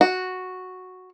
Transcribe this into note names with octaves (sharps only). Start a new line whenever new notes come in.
F#4